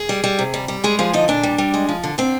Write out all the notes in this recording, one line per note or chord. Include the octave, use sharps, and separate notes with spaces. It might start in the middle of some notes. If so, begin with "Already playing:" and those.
Already playing: G#4
G3
G3
C3
G3
G3
G#3 G#4
F3 G#4
D3 D#4
A#2 D4
G3
G3
G#3
F3
D3
D3 C4